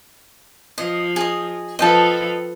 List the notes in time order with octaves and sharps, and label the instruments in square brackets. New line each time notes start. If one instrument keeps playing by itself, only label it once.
[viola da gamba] F3 [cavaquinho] D#5
[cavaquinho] G#4 D#5
[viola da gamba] F3 A4 B4 [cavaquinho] D#5 G5 A5